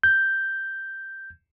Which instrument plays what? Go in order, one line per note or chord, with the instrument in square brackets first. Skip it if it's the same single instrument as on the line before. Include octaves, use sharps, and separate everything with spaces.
[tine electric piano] G6